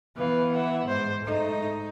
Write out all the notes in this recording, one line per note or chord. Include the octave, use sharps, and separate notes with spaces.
E3 B3 B4 F5
E5 F#5
G#2 C5
G#2 A3 D#4